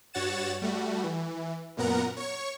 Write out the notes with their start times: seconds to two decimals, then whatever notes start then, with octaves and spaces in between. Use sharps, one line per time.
0.14 G2 F#4 C#5 F#5 A6 E7
0.62 G3 A3 F#4
1.04 E3
1.77 F#2 A#2 B3 A#4 F#5 A#5
2.17 C#5 C#6